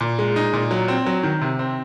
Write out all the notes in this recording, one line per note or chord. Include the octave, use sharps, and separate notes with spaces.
A#2
G#3
D#4
A#2
F#3
C4
F#3
D#3
C3
C4